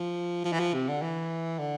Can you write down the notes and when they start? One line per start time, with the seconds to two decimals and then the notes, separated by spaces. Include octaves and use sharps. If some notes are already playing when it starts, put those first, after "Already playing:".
Already playing: F3
0.45 F3
0.53 E3
0.60 F3
0.74 C3
0.89 D3
1.02 E3
1.59 D3